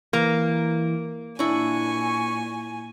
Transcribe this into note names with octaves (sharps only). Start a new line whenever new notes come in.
E3 A#3 A#5
A#2 D4 E4 G#5 C#6